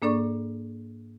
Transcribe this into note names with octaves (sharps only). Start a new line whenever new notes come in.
G#2 A#3 D4 A4 D5 C#6